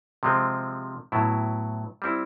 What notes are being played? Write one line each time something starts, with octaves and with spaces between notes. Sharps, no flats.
C3 F3 G#3 C4
A2 F#3 B3 E4
G3 C4 E4